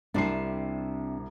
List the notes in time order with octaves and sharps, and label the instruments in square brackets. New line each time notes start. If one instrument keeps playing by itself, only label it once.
[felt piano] C2 G3 C7 [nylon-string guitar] C3 D4